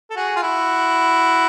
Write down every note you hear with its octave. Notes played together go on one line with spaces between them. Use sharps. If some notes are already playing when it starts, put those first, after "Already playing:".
A4
F#4 G#4
F4
E4 F#4